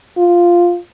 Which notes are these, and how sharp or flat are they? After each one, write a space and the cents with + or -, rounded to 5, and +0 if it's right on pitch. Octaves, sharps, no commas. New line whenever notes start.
F4 +0